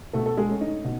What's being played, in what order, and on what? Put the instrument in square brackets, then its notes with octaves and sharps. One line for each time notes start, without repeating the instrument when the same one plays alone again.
[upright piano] B2 A3 A4
A4
G#3 G#4
A3 C#4
D#4
B2